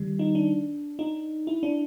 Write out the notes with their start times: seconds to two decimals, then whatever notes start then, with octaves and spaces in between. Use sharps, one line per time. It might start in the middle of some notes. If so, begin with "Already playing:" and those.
Already playing: D#3 G3
0.19 D#4
0.35 D4
0.99 D#4
1.47 E4
1.63 D4